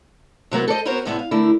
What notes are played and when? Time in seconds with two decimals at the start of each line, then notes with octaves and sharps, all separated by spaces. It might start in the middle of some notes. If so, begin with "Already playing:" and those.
0.51 C3 F#3 A#3 B3
0.68 A4 C5 D5 D#5
0.85 B3 C4 F#4 A#4 C5 C#5
1.05 A2 C3 G#3 B3 D4 E5
1.19 F5
1.31 D3 A3 E4 A#4